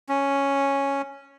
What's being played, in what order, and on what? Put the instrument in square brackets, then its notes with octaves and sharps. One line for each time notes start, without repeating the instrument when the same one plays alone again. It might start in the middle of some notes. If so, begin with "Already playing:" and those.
[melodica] C#4